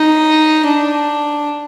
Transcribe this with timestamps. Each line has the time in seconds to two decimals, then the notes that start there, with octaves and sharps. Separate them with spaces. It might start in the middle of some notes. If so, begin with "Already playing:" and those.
Already playing: D#4
0.66 D4